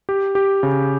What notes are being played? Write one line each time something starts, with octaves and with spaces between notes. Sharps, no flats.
G4
G4
C#3